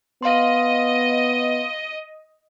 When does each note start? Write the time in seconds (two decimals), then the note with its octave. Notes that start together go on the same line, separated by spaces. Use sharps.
0.23 B3 D#5 F5 C6